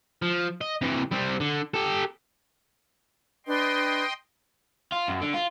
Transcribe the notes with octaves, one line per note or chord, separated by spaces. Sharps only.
F3
D#5
C3 E3
G3 C4
D3
G4 A4
D4 B4 D#5 G5 C6
F4
F#2
D3
F4